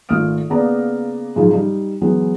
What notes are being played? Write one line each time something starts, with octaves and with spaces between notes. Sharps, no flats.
G#1 A3 F4 D#6 F6 D7
C#3 A#3 B3 D5 A#5
G#2 C#3 F3 F#3 D#4
G3 D#4
E3 F#3 G#3 B3 E4